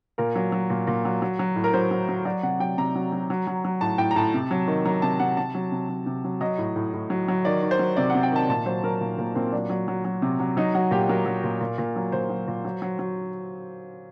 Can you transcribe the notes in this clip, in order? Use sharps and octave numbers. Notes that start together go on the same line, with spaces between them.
A#2 A#4
F#3
F#3
A#2
A#2
F#3
F#3
F#3
A2
A#4
F#3 C5
F#3
F#3
F#3 D5
C3 F#5
F#3 G5
C3 A#5
F#3
F#3
F#3
F#3
F#3
A2 A5
A2 G5
A#5
A2 A5
C3
F#3
D#3
F#3 A#5
C3 A5
C3 F#5
C3 A5
F#3
C3
F#3
C3
F#3
F#3 D#5
A2
A2
A2
F#3
F#3
D#3 D5
D#3
C5
F#3
C3 D5
C3 F#5
G5
D#3 A5
A#2 A5
F#3 C5
F#3 A#4
A#2
A#2 A#3
A#2 C4
F#3 D4
F#3
F#3
F#3
C3
F#3
F#3 D#4
F#3 F#4
A#2 G4
F#3 A#4
F#3
A#2
A#2
A#2
F#3
A#2 C5
F#3
A#2
F#3
F#3
F#3